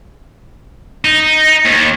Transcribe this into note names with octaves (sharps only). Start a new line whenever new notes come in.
D#4
D#2